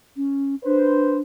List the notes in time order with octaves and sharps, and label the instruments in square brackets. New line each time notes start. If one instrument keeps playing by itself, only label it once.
[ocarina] C#4
[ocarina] D4 [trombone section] B4 C5